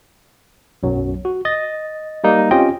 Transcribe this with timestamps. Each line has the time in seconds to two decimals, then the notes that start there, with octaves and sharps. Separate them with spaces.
0.83 B1 F#2 F#3
1.25 F#4
1.45 D#5 A6
2.24 G3 A#3 D#4
2.51 C4 C#4 F4 G4 D#5 G5